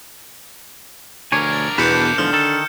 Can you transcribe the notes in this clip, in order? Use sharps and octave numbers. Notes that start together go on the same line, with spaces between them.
D2 D4 A#4 C#5 G#5
A6
E2 B2 B4 G6 C#7 E7
E2 G#2 D3 F3 F6
D#3 A4